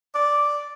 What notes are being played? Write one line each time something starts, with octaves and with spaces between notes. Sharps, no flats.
D5